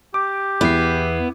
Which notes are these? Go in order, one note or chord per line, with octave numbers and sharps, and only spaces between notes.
G4 D6
E2 B3 E4 C7